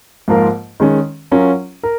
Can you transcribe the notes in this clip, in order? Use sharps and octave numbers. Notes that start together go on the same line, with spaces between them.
G#2 F3 A#3 F4 A#4
D#3 G#3 C#4
F#3 C#4 F4 A#4
A#4